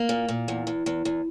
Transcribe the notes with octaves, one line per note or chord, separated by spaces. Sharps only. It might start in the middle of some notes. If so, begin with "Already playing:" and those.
Already playing: A#3
A#2
A#2
E2
E2
E2
E2